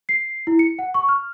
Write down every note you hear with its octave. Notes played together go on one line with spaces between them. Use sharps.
C7
E4
C#7
F#5
C#6
F6